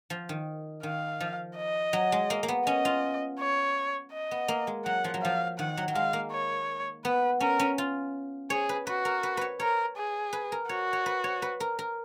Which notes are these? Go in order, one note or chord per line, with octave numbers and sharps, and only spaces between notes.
F3
D#3
D#3 F5
F3
D#5
F#3
G#3
A#3
A#3
B3
C#4 D#5
F4
C#5
D#5
B3
A#3
G#3
F#3 F#5
F3
F#3
F3 F5
D#3 F#5
F#3
F#3
G#3 F5
A#3
C#5
B3 B4
C#4 A#4
C#4
F4
G#4 C#5
B4
F#4 B4
A#4
B4
B4 C#5
A#4 C#5
G#4
B4
A#4
F#4 C#5
C#5
B4
C#5
B4
A#4
A#4